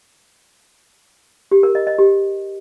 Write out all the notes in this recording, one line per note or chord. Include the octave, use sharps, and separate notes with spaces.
G4
A#4
D#5
D#5
G4